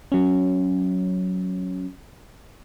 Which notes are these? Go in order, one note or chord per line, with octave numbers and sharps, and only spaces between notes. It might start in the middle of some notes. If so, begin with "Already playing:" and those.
F#3 C#4